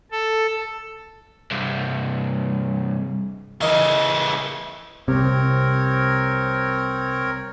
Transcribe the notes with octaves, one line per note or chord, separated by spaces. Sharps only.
A4
C2 G2
C#3 E3 A#4 D#5
C2 C3 C4 A#4 C#5